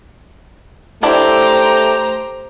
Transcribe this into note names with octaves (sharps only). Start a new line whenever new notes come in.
A3 D4 E4 G4 C5 A#5 B5